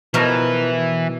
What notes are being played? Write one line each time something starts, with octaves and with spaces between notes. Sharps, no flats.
B2 E3 F3 A#4